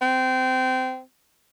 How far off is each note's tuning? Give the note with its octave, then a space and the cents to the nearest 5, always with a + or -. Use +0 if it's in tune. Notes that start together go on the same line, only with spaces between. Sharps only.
C4 -20